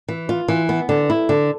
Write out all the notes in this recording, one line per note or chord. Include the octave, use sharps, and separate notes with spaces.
E3
F4
E3
B3
D3
E4
D3